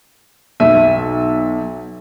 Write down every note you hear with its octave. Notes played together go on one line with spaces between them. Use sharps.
B1 E5 D#7